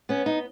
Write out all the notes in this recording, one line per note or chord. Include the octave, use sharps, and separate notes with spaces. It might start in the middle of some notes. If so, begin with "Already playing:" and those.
B3 C#4
D#4